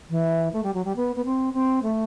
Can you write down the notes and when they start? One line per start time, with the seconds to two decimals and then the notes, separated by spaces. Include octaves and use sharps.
0.10 E3
0.53 A3
0.63 G3
0.74 F#3
0.85 G3
0.96 B3
1.16 B3
1.25 C4
1.54 C4
1.83 A3